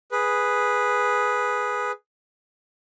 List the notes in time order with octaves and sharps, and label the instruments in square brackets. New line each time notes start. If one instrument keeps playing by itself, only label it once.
[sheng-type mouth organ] G#4 B4